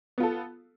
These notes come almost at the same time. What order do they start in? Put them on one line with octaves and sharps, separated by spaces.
B3 F4 A4